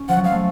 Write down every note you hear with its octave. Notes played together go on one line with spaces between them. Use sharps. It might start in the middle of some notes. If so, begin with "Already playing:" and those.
Already playing: C#4
F3 F#5
F#3
G#3 F5
A3